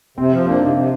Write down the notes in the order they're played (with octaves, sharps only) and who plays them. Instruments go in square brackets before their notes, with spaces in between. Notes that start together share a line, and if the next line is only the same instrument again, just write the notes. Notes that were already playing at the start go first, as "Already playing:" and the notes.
[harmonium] C3 [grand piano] C4
[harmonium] F3
[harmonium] A#3 [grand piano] D4
[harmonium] C3 [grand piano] D#4
[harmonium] C3